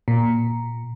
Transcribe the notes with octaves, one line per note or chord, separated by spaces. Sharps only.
A#2